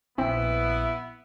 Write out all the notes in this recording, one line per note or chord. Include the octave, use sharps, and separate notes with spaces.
A#1 B3 C4 E4